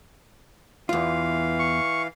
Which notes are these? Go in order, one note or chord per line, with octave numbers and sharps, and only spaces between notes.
E2 E3 F4 F5
C#6